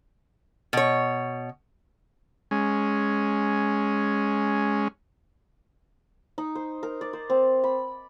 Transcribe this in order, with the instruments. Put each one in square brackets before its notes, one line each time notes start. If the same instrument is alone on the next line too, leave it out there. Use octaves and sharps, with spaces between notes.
[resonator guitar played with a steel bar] B2 C#5
[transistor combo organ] G#3 C#4
[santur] D#4
C5
A#4
D5
C5
C4
B5